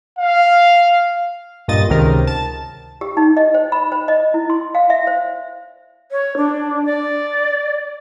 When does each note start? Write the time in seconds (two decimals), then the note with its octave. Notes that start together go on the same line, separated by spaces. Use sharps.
0.19 F5
1.68 G2 A#2 D#5 A6
1.89 C#2 C3 D#3 A#4
2.27 A5
3.01 G4
3.17 D#4
3.37 D#5
3.54 C5
3.72 B5
3.92 C5
4.08 D#5
4.34 E4
4.50 C6
4.75 F5
4.90 E5
5.07 C5
6.11 C#5
6.37 D4
6.85 D5